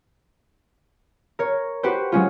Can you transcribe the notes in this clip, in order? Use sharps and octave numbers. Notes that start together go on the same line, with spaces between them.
A#4 C#5
F#4 G4 B4 C5
F#3 G#3 C#4 F4